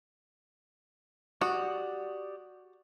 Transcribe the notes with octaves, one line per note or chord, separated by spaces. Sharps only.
F#4 G4 D5 D#6